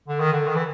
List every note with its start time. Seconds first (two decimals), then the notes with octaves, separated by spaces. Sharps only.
0.08 D3
0.20 D#3
0.32 D3
0.48 D#3
0.56 E3